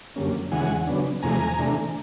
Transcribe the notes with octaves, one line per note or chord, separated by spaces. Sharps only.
F#2 D3 G3 A#3 C#4
E2 C#3 E3 G#3 F#5 G#5
C#3 F#3 B3 D4
E2 C3 F3 A3 G#5 A#5
C3 E3 A3 D4